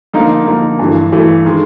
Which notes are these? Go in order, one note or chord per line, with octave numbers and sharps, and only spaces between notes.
D3 F3 A#3 D#4
D3 F3 A#3 D#4
G2 E3 A3
G2 E3 A3
D#3 G#3